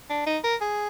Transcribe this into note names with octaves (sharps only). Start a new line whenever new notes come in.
D4
D#4
A#4
G#4